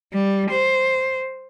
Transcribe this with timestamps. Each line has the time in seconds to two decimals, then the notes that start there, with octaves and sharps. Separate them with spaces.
0.13 G3
0.51 C5